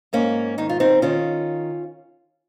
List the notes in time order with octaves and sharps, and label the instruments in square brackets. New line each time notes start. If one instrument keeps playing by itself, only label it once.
[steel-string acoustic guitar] G#2 A#3 C#4
D#3 D#4
F4
C4 D#4
D#3 C#4 F4